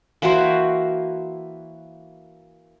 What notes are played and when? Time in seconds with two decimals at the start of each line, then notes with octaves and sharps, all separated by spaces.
0.22 E3 A#3 F#4 C5